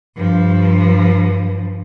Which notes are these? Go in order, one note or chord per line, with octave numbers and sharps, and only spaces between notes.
G2 F3